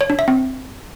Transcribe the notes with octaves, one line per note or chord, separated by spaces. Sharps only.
C#5
D4
E5
C4